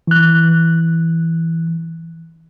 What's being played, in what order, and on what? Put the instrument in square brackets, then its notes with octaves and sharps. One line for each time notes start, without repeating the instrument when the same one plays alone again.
[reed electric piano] E3 F#6